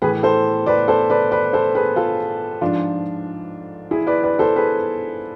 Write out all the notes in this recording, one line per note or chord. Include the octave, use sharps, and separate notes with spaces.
A2 E3 G#4 B4
A4 C5
B4 D5
A4 C5
B4 D5
B4 D5
A4 C5
G#4 B4
F4 A4
G#2 F3 D4 F4
E4 G#4
B4 D5
B4 D5
A4 C5
G#4 B4